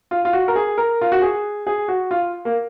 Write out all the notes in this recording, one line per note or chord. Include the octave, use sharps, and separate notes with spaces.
F4
F4
F#4
A#4
G#4
A#4
F4
F#4
G#4
G#4
F#4
F4
A#3